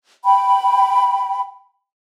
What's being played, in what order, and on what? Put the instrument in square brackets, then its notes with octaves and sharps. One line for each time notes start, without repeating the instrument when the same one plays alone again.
[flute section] G5 B5